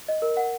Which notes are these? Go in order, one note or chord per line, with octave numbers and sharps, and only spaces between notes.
D#5
A#4
F#5